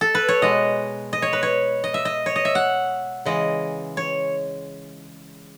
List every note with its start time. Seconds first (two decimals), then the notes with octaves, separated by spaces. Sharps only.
0.01 A4
0.15 B4
0.29 C#5
0.42 B2 G#3 D#5
1.13 D#5
1.22 C#5
1.33 B4
1.43 C#5
1.84 D#5
1.94 E5
2.05 D#5
2.26 C#5
2.36 D#5
2.45 E5
2.55 F#5
3.25 C#3 E3 G#3 D#5
3.97 C#5